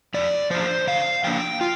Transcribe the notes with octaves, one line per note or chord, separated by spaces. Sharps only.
F2 D5
F3 D4 C5
D3 F5
F3 A#3 D4 G5
F4